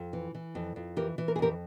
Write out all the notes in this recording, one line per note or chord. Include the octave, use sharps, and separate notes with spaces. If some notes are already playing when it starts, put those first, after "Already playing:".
Already playing: F2
E3
E3
F2
F2
E3 G4 A#4
E3
A#4
G#4
F2 G4 A#4